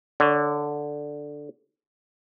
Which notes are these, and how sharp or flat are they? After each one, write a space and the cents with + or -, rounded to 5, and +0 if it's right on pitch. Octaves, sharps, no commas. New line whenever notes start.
D3 +0 D4 +0 C#5 +30